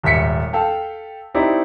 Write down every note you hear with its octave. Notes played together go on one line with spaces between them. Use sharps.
D#1 G#1 E5 B6 C#7
A4 F5 G5 A5
C4 D#4 E4 G4 D5